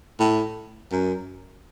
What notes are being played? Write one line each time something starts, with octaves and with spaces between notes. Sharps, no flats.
A2
F#2